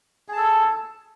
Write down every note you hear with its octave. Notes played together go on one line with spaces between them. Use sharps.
G#4 A4 A5